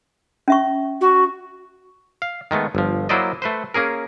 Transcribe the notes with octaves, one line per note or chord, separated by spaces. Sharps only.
C#4 E5 C#6
F#4
F5
D#3 G#3 A3 B3
G1 F3
F#3 A#3 E4 C5 D5 D#5
A3 B4 C5
A#3 C#4 G#4 A#4